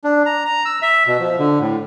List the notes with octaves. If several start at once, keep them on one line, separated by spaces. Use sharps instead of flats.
D4
A#5
A#5
E6
E5
B2
F3
D3
A2